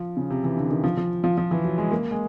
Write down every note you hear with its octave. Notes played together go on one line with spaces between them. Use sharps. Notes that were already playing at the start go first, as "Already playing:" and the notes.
Already playing: F3
C#3
C3
E3
D3
D#3
F3
F3
F3
F3
E3
F#3
G#3
A#3
G#3